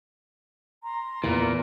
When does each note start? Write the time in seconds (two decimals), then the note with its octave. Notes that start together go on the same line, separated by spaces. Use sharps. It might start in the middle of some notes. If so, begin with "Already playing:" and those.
0.84 A#5 C6
1.24 E2 A#2 E3